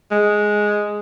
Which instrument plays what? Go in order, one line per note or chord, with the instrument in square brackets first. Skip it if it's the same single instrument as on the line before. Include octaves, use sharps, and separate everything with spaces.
[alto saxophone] G#3